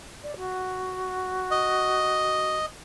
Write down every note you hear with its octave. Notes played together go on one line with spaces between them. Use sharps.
D5
F#4
D#5